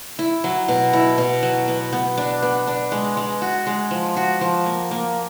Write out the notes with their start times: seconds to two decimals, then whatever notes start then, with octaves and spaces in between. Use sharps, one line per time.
0.19 E4
0.44 F#3
0.68 B2
0.93 E4
1.18 B2
1.43 F#3
1.68 B3
1.93 B3
2.18 D4
2.43 B3
2.67 D4
2.92 G#3
3.17 G#3
3.42 F#4
3.67 G#3
3.91 F3
4.16 F#4
4.41 F3
4.66 A#3
4.91 A#3